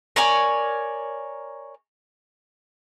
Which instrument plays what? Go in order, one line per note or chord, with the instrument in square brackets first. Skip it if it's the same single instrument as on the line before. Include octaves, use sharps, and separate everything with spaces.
[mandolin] A#4 C#5 D5 G#5